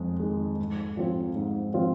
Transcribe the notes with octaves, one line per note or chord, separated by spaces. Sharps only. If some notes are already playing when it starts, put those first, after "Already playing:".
Already playing: F2 G#3
D#3 G#3
G#2
F3 C4 F4
G#2
F3 C4 F4